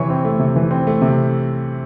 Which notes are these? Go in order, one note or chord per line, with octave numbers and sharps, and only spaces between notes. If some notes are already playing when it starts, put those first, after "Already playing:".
Already playing: C3 E3 C#5 C#6
C4
A3
C3
E3
C4
A3
C3